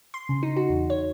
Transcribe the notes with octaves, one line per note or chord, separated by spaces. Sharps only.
C6
C#3
D#4
F#4
E2
C#5